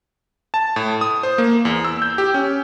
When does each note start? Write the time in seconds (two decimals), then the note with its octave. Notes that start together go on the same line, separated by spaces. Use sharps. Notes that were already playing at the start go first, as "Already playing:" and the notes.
0.54 A5
0.76 A2
1.01 D#6
1.23 C5
1.38 A#3
1.65 E2
1.85 E6
2.02 G6
2.18 G4
2.34 C#4